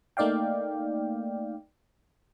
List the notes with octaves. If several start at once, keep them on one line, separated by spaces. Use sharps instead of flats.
A3 A#3 D#4 D5 F5 G5